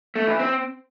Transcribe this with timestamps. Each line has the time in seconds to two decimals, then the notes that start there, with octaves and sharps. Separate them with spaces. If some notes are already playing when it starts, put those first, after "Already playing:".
0.16 A3
0.27 E3
0.39 C4